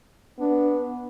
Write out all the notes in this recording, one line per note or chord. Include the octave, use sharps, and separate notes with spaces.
B3 D4